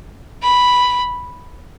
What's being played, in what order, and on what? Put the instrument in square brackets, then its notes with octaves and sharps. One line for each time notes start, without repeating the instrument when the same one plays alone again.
[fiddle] B5